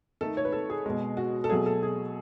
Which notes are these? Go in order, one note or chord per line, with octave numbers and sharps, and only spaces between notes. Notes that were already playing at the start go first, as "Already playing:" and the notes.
D#3 A3 A4
C#5
B4
A4
G#4
B2 G#3
F#4
A4
B2 F#3 A3 G#4
A4
G#4